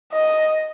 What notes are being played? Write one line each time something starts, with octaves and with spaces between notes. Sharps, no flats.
D#5